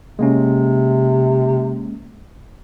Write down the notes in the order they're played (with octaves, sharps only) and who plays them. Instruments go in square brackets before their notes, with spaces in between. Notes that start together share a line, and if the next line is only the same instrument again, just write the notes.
[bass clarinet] C3 [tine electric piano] G#3 A#3 C#4